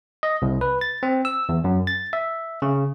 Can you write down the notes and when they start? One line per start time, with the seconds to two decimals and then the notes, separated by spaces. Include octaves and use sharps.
0.23 D#5
0.42 C2
0.61 B4
0.81 A6
1.03 C4
1.25 E6
1.49 E2
1.64 F#2
1.87 A6
2.13 E5
2.62 C#3